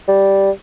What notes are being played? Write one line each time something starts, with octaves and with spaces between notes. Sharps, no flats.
G3